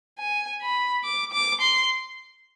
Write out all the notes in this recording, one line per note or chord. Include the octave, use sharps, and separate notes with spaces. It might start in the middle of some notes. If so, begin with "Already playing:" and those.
G#5
B5
D6
D6
C6